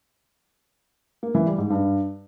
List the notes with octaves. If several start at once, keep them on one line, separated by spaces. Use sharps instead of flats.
A#3
E3
G3
G#2
G2